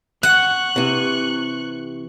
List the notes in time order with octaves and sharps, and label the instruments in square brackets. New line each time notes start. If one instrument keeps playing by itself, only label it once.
[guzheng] F#5 [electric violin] C#6 F#6
[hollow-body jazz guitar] C3 E3